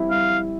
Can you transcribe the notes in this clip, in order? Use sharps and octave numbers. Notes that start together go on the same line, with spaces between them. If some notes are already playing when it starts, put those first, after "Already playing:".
Already playing: G3 C4 E4
G3 F5